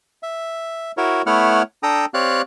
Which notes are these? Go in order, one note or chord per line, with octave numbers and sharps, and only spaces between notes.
E5
E4 F#4 A#4 C#5
A3 B3 E4 C#5 F#5 F6
D4 A4 G5 A#5 D#6
C4 G4 C#5 D5 F5 F#6